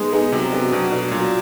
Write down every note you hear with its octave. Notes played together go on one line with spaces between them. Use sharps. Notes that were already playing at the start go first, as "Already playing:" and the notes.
Already playing: G#3 B3 D#4 G#4
B3 D#4 G#4
C3 F#3
B3 D4 F#4
B2 F#3
B3 D4 F#4
A#2 F#3